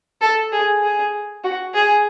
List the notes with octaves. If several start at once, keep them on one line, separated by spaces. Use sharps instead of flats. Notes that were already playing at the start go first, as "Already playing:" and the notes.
A4
G#4
G#4
F#4
G#4